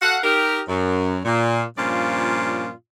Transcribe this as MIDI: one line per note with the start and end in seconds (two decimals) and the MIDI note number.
0.02 0.18 66
0.02 0.18 69
0.02 0.18 77
0.02 0.18 78
0.24 0.62 63
0.24 0.62 67
0.24 0.62 70
0.69 1.18 42
1.25 1.63 46
1.78 2.70 43
1.78 2.70 46
1.78 2.70 53
1.78 2.70 61
1.78 2.70 65
1.78 2.70 74